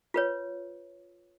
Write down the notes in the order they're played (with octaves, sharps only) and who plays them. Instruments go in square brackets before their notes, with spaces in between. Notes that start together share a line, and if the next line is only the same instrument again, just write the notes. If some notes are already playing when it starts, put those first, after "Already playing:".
[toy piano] F4 B4 C#5